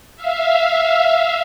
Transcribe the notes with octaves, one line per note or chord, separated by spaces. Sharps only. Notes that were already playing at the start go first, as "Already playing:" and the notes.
E5 F5